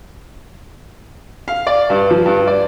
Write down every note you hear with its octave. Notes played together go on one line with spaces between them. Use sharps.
F5
D5
G2
F3
G2
D5